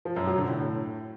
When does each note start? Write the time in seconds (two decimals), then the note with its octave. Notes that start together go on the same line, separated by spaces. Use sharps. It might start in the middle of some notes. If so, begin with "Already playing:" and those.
0.05 F3
0.16 F#2
0.27 F#3
0.38 D3
0.49 A2